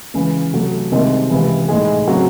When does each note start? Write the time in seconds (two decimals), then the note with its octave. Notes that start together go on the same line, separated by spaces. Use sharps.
0.14 C#2 C#3 E3
0.53 C3 F#3 A3
0.92 C2 C3 D#3 G#3 C4
1.30 C#2 C3 E3
1.68 A2 G#3 D#4 G#4
2.07 C#3 F#3 C4 F#4